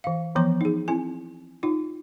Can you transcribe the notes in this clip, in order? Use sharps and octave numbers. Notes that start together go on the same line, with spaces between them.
E3 F5
E3 F3 B3 C#5 A#5 C6
D#4 G#4
C4 E4 G#5
D#4 F4